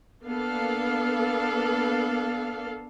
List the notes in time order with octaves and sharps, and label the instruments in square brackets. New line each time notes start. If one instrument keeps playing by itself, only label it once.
[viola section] A#3 B3 D4 A4 F5